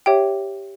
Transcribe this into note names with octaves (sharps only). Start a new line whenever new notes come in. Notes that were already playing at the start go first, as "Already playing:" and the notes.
G4 C#5 E5 G5